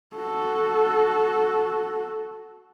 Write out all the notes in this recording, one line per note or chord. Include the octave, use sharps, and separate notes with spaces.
F#4 A4